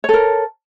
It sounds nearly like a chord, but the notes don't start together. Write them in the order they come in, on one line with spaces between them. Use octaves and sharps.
C#5 A4 A#4